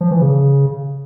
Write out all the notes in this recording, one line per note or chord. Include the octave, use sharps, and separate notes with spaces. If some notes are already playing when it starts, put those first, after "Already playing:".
F3
E3
C#3